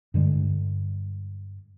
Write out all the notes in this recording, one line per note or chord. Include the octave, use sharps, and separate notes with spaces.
G2 D3 G3 G#3